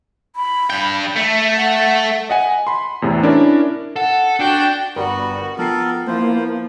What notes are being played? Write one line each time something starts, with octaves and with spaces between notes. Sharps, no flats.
B5
G2 G5
A3 E5
F#5
D#5 F#5 G#5
B5 C6
E2 A2 C3
C#4 D4 E4 A#4 D5
A4 F#5
D4 F#4 G5
G1 G3 B3 F#4 A#4
F3 B3 A4 A#4 G5 C7
F3 A#3 B3 E4 C5